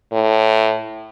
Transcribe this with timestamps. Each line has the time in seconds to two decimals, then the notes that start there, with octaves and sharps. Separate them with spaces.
0.13 A2